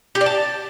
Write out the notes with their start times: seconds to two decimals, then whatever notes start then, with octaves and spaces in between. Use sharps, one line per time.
0.15 G4
0.21 D5
0.26 A5